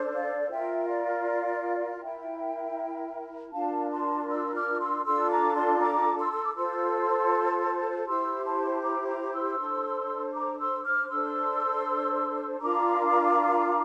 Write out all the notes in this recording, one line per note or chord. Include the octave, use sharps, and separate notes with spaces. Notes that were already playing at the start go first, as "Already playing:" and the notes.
Already playing: D4 A4 C5
D5 F5
F4 A#4 E5 G5
D5 F5
E4 A#4 E5 G5
D4 F4 A#4 F5 A5
A5 C6
C6 E6
D6 F6
D6
C6 E6
D4 F4 A4 C6 E6
A#5 D6
A5 C6
A#5 D6
C6 E6
C6
D6
F4 A4 C5 C6 E6
E4 G4 C5 C6 E6
A5 C6
A#5 D6
A#5 D6
C6 E6
D4 A4 C5
A#5 D6
C6 E6
D6 F6
D4 A4 C5 C6 E6
D4 F4 A#4 A#5 D6